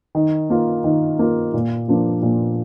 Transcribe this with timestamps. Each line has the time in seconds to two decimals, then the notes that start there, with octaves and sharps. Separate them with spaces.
0.15 D#3
0.50 A#3 F4
0.84 D#3
1.19 A#3 F4
1.54 A#2
1.88 F3 A#3 D4 F4
2.22 A#2